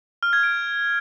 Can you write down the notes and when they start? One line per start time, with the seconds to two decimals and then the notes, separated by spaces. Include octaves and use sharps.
0.23 F6
0.33 G#6
0.43 D7